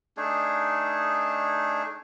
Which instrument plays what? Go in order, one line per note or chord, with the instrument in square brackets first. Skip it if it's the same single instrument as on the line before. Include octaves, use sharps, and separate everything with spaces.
[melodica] A3 D4 D#4 G#4